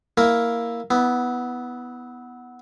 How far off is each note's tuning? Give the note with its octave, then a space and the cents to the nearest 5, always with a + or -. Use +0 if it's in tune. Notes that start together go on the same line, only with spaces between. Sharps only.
A#3 +0 E4 +0 A#4 +0
B3 +0 E4 -25